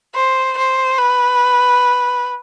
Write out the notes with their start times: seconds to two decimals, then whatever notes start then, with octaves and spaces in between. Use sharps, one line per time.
0.15 C5
0.58 C5
0.99 B4